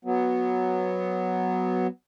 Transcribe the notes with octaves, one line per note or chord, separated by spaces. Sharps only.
F#3 B3